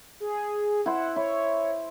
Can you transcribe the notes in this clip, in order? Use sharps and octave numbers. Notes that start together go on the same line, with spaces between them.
G#4
E4 C5 F#5
E4 C#5